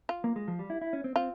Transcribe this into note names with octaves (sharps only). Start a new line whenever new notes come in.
F4
A#3
G#3
F3
G3
E4
E4
C#4
C4
C4 F4